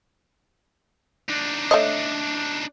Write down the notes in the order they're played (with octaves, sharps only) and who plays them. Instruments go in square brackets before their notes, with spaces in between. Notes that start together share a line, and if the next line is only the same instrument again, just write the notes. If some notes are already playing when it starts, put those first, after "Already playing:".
[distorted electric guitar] D4 D#4
[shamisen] A3 C#5 D#5